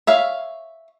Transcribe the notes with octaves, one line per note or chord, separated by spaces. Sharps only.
C#5 E5 F5